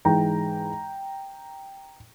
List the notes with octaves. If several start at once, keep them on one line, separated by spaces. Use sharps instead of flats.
G#2 E3 G#3 G5 A#5